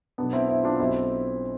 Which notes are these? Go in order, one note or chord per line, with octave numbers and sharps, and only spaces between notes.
B1 B2 B3 D4
C4 E4
C4 E4
D4 F4
B1 B2 C4 E4